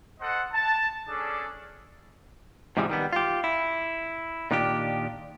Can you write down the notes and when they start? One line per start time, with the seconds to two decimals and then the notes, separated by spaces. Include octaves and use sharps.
0.21 A4 C5 D#5 F#5
0.53 A5
1.08 C#4 D4 G#4 A4 D5
2.77 G#2 C3 E3 F3 G3 G#3
2.90 D#3 G3 B3
3.13 F4 G4
3.44 E4
4.51 A#2 D#3 D4 F4 G4